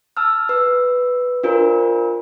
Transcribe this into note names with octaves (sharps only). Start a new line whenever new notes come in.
A5 E6 F6
B4 E6
D4 F4 A#4 C5